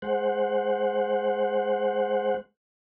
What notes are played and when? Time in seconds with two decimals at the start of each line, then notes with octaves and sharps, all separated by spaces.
0.02 G#3 C5 F#5